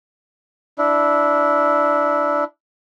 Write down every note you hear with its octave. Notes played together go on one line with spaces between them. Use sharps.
D4 E4